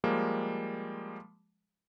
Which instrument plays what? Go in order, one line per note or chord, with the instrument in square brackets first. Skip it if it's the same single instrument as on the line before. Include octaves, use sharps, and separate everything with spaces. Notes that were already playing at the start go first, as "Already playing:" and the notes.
[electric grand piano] F3 G3 G#3 A#3